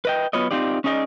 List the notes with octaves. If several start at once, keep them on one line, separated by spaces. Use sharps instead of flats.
B4 D#5 G5
F#3 B3 F4 B4 C#5 D#5
C4 D#4 F4 G4 D5
C#4 D#4 G#4 D5 D#5